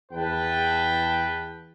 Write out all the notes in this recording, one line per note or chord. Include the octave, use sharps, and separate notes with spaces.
E2 B4 G5 A5